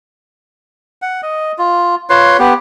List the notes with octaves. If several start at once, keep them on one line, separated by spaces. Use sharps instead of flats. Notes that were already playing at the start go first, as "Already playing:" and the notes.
F#5
D#5
F4
F4 B4 C#5 C6
B3 G4